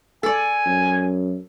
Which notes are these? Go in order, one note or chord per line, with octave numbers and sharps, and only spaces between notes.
A4 D5 G#5
F#2